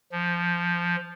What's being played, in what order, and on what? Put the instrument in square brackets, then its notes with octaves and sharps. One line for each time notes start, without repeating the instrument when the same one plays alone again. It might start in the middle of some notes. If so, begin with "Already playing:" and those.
[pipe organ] F3